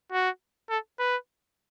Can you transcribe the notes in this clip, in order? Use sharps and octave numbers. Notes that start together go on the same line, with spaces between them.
F#4
A4
B4